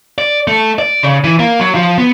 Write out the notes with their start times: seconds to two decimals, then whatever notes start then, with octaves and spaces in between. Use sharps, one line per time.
0.18 D5
0.48 A3
0.79 D5
1.03 C#3
1.24 E3
1.39 A#3
1.60 F#3
1.75 F3
1.98 B3